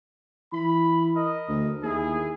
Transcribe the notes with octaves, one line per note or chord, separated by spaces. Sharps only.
E3 B5
A#4 D#5
D2
D#2 E4 G#4